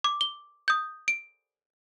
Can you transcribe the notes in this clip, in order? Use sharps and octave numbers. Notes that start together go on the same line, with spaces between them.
D6
G7
D#6 G6
D7